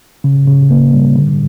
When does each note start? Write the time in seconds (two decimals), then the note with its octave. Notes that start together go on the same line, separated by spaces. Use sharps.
0.24 C#3
0.47 C#3
0.71 A#3
0.93 G3
1.16 D3